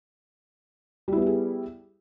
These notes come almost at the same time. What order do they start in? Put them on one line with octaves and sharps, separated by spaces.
G3 E4 B3 G4 G#4